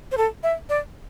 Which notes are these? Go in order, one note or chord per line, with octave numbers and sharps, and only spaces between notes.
C5
A4
E5
D5